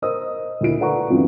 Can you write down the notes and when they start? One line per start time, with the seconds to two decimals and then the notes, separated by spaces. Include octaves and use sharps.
0.02 A#4 C5 D#5 D#6 E6
0.61 D2 A#2 E4 D7
0.80 A4 B4 D5 F#5 A#5 C#6
1.09 G2 E3 F#3 C4 C#4 F4